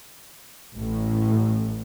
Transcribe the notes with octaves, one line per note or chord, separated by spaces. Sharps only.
A1 A2